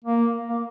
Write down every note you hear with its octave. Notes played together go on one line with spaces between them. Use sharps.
A#3
A#3